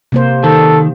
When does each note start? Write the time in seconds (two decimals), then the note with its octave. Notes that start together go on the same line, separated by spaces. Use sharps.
0.12 C3 A#3 C5
0.44 D#3 A4